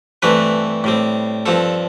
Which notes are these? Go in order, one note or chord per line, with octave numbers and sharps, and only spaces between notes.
G2 E3 A3 C4 B4
A2 G3 C4
G2 F3 C4 A4